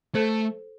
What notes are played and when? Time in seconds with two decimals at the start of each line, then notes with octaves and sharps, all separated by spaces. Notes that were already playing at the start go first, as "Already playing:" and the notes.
0.15 A3 A4 C5